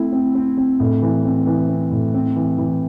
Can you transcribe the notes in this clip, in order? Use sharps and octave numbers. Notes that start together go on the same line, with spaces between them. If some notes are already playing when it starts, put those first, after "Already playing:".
Already playing: A3 C4 E4
C4
C4
C4
A2
E3
C4
E3
C4
A2
C4
E3
E3